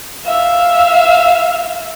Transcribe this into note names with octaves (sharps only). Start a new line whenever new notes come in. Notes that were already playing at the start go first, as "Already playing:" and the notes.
E5 F5